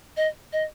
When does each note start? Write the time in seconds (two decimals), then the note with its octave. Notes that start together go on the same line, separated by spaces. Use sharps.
0.17 D#5
0.53 D#5